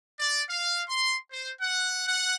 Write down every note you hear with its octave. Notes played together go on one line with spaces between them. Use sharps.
D5
F5
C6
C5
F#5
F#5